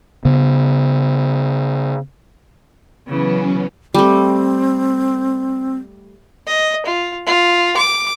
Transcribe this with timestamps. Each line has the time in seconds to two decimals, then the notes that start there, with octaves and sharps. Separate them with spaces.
0.25 C#3 B3
3.07 C#3 E3 F#3 B3 C#4
3.94 G3 A3 C4
6.47 D#5
6.86 F4
7.27 F4
7.77 D6